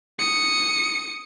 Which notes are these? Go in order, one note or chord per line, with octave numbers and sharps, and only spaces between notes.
D#6 C#7